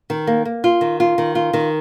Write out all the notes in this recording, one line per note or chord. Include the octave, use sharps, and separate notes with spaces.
D#3
A#3
A#3
F4
D#3
F4
D#3
F4
D#3